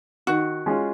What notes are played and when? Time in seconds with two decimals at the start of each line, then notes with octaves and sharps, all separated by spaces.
0.27 D#3 F#4
0.66 G#3 C#4 F4 G#4